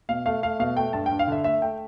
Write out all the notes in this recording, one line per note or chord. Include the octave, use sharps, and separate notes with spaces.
B2 F5
A3 F5
A3 F5
B2 F5
A3 G5
G2 A5
G5
G2
F5
D3 E5
A3 E5
A3 G5